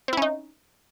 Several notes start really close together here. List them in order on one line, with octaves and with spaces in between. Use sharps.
C4 E4 C#4 D#4